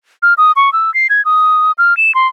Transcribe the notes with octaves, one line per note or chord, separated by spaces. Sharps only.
F6
D#6
C#6
E6
C7
G#6
D#6
F6
E7
C6